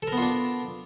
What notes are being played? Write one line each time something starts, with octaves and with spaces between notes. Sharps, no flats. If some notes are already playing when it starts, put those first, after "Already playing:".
B3 D4 F4 A4 A#4